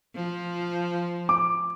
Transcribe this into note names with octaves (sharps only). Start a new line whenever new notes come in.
F3
D6